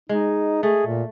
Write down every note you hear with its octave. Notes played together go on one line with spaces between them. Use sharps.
G#3 D#4
A3 G#4
A#2